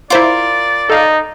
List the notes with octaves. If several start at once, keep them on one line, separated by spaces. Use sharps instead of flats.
E4 F4 A#4 C5 D5 D6
D#4 A4 F5